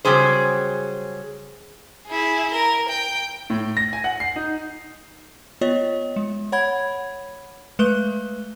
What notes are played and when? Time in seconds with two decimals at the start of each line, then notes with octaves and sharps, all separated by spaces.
0.05 C#3 F#3 G3 G#4 C5
2.07 E4 G#4
2.52 A#4
2.89 G5
3.50 A2
3.77 A#6
3.93 G#5
4.04 F#5
4.20 C7
4.36 D#4
5.61 B3 F4 C#5 D#5
6.16 G#3
6.52 C#5 F#5 B5 G#6
7.79 G#3 A3 B4 F#6 G7